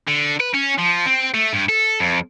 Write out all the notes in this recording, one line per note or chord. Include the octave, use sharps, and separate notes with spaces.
D3
B4
C#4
F3
C4
A3
G2
A4
F2